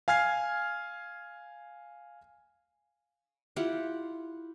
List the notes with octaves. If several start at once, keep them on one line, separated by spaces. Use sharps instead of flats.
F5 G#5 F6 G#6 C7
E4 F4 G4 F#5